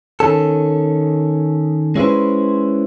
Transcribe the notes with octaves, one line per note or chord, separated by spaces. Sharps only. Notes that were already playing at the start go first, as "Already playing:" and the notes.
D#3 C#4 A4
G#3 C#4 E4 G#4 B4 C5